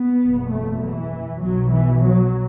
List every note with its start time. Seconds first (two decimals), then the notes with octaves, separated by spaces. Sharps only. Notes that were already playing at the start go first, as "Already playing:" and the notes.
Already playing: B3
0.21 F#1 E2 B2
0.51 A3
0.82 E3
1.41 B1 B2 F#3
1.71 E3
2.02 F#3